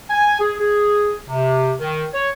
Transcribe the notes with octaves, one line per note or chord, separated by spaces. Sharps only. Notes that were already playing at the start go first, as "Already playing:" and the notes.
G#5
G#4
G#4
C3
D#3
C#5